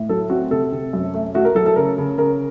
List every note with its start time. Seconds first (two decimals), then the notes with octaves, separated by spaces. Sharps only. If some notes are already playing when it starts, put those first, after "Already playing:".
Already playing: A2
0.09 F#3 A4
0.30 C4 F#4
0.51 C3 A4
0.72 C3
0.93 F#2
1.14 A3
1.35 A3 F#4
1.45 A#4
1.55 F#3 A4
1.66 A4
1.76 C#3 A#4
1.98 C#3
2.18 C#3 A#4